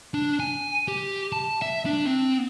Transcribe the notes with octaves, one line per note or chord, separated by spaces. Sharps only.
D4
G#5
G4
A5
E5
D4
C4